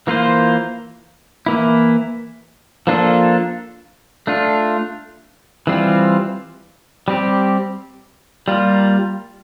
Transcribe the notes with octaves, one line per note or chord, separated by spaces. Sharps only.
E3 A#3 F4 C5
E3 A#3 E4
F3 A#3 D4 F4 A4
A3 D4 F4
E3 G3 C4 F4
G3 C4 G4
G3 A#3 F4